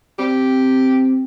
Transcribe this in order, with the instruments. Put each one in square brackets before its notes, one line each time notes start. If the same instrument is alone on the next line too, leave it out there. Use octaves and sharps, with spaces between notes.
[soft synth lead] C4 [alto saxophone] G4